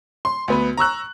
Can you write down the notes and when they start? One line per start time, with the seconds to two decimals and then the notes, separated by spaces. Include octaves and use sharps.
0.25 C6
0.48 D2 B3 B4
0.77 A#5 C#6 E6 F#6